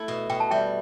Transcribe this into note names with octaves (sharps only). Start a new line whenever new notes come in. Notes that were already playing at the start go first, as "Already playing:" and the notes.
Already playing: A3 E4
B2
B2 G5
A5
G3 E5 G5